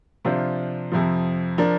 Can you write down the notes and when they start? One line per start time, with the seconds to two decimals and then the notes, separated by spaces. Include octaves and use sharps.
0.25 C3 F3 D4 F4 C5
0.92 F2 C3 F3
1.58 F3 D4 A#4